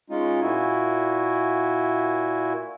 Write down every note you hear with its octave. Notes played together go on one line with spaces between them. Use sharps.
G#3 C#4 D#4 F4
A#2 E4 F#4 G#5